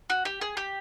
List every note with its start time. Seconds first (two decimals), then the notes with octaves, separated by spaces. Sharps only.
0.10 F#4
0.25 G4
0.41 G#4
0.57 G4